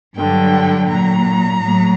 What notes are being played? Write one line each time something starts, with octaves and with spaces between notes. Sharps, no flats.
G2 D3 F#3 G5
A#2 F#3 A#5
A2 F#3